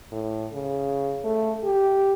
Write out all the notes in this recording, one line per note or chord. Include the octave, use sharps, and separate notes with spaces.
A2
C#3
A3
G4